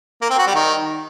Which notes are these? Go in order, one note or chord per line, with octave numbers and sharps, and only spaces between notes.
A#3
C4
F#4
G3
D#3